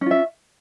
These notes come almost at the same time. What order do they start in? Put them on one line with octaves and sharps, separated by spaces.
C#4 F4 E5